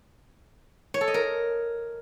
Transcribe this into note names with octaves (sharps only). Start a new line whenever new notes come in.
C#5
A4
D#5
A#4